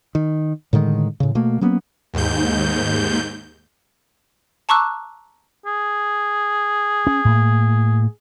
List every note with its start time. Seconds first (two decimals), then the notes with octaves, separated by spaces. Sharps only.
0.15 D#3
0.73 A2 D3 D#3 G#3
1.20 A2 C#3
1.35 B2 A3 A#3
1.61 F#3 A#3 B3 C#4
2.14 D#2 G#2 G6
4.69 A5 A#5 C#6 D6 E6 F#6
5.66 G#4
7.07 C#4
7.25 A2 A#3